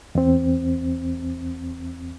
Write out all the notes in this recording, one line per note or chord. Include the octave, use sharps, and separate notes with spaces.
E2 C4